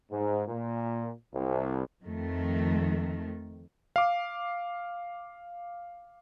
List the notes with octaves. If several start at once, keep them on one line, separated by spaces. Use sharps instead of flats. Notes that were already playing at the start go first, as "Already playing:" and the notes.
G#2
A#2
C2
F2 D#3 A3
F5 D6